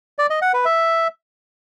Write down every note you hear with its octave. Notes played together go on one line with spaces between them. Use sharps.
D5
D#5
F#5
B4
E5